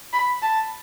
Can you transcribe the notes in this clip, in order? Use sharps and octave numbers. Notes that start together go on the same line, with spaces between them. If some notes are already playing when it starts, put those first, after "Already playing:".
B5
A5